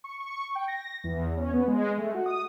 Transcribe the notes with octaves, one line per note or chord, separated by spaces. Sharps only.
C#6
C#6
G5
A#6
E2
C#4
B3
G#3
A3
F#4
D#6